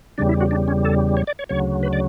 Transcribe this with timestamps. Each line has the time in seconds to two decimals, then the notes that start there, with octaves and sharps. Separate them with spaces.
0.18 E2 C#3 G3 D4
0.29 E4
0.41 F#4
0.51 D4
0.68 C#4
0.85 A4
1.17 C#5
1.27 D5
1.39 C#5
1.49 D2 C#3 F#3 C#5
1.83 B4
1.93 D5